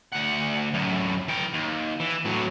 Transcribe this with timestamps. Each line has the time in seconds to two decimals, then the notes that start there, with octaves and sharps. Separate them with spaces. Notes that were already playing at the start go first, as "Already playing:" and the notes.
0.12 D2 F#5
0.74 F#2 A2
1.28 E3 G5
1.54 D#2
2.00 E3
2.25 A2 F#3